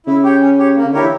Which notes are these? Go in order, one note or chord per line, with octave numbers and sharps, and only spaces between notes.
C#3 E4
G4 C#5 G5
C#4
G4 C#5
A#3
C#3
D3 E4 G4 A#4 C#5
E3